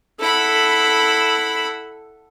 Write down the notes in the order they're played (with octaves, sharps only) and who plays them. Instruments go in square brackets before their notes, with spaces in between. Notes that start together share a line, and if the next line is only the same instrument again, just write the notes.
[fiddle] E4 B5 [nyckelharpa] A4 F#5